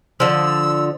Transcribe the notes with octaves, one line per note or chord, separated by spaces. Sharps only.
D3 F3 E6